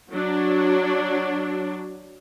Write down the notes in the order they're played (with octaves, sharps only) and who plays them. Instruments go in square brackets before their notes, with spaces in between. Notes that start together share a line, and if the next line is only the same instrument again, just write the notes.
[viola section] F#3 D4